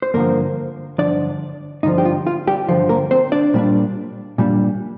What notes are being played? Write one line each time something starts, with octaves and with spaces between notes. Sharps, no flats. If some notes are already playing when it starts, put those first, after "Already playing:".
C5
G2 D3 F3 A#3 A#4
G2 D3 F3 D4 D5
G2 D3 F3 D#4
G4
F4
F4
G3 G4
G2 D3 F3
A#3 A#4
C4 C5
D4 D5
A#2 G3 D4
A#2 G3 D4